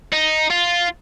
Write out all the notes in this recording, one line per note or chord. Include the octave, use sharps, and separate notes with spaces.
D#4
F4